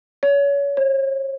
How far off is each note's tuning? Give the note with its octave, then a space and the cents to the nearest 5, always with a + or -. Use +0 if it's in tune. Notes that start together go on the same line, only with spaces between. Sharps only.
C#5 +30
C#5 -45